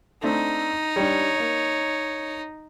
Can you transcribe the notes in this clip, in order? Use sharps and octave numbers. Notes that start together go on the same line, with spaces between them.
A3 C4 D4 D#4
G3 D4 C#5
A#3 D#5